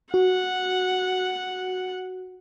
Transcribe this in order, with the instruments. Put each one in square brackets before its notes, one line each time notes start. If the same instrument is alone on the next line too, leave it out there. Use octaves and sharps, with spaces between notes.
[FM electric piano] F#4 [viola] F#5